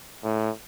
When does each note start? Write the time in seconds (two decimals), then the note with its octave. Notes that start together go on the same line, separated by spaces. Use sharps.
0.24 A2